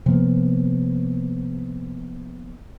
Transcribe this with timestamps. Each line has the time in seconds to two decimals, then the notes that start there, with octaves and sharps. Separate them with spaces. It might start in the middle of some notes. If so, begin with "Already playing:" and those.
0.06 C3 F3 A#3 B3